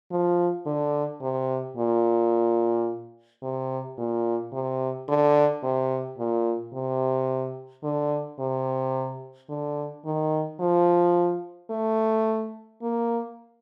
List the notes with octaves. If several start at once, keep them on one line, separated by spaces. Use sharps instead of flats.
F3
D3
C3
A#2
C3
A#2
C3
D3
C3
A#2
C3
D3
C3
D3
D#3
F3
A3
A#3